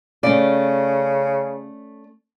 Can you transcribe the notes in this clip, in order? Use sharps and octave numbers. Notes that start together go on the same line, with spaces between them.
C#3 A3 C#4 D5